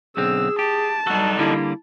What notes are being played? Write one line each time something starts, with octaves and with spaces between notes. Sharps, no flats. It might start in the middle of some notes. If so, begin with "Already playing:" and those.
B1 D3 C4 G#4 E6
G4 A5
G3 D#4 F#4 A4
D3 G3 A#3 E4